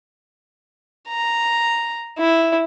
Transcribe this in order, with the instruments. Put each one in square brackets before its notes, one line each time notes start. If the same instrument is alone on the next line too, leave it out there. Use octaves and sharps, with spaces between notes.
[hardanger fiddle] A#5
E4